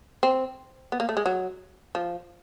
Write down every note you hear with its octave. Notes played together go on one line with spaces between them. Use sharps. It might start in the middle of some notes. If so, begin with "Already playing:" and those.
C4
B3
A#3
A3
G#3
F#3
F3